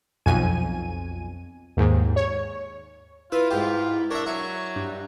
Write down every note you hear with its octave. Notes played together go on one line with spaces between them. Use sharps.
B1 F2 G#5 D#7
D#2 G#2
C#5
E4 F4 B4
G#2 F4 G4
D4 A#4 C#5 E5
F#3 E4 C#6
G2